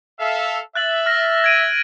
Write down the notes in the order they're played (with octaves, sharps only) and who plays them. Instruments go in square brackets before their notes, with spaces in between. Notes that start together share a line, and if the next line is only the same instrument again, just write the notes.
[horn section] A4 E5 F5
[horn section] E5 [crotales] F#6 A6 F#7
[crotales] F6 A#6
G#6 D7 D#7